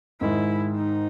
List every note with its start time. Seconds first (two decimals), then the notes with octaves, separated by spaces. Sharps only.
0.20 G#2 D#3 G#3 E4
0.76 D#4